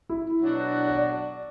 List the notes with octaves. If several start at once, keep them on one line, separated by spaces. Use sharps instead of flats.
E4
B2 F#3 D4 F#4
D5